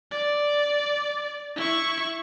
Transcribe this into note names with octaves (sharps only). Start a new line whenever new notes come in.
D5
E4 C#6